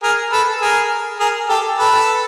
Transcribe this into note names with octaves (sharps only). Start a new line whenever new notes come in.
G#4 A#4
A4 B4
G#4 A#4
G#4 A#4
G4 A4
A4 B4